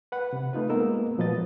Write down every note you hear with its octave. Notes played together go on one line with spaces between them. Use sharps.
B4 F#5 B5
C3
A3 D#4 F4 B4
G#3 A#3 B3 A#4 D#5 E6
A#2 F3 F#3 B4 D#5 A6